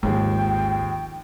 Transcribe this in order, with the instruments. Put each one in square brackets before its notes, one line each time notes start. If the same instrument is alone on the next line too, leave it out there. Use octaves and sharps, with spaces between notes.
[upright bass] G#1 [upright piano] D#2 F3 G#4 [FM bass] G#3 [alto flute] G5